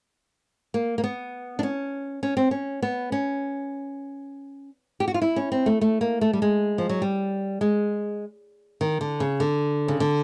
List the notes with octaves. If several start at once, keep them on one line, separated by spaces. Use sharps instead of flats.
A#3
A#3
B3
D4
C#4
C#4
C4
C#4
B3
C#4
G4
F#4
F4
E4
C#4
C4
A3
A3
A#3
A3
G3
G#3
F3
F#3
G3
G#3
D#3
D3
C#3
D3
C#3
D3